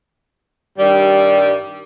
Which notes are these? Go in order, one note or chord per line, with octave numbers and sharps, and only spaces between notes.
G2 D#3 G3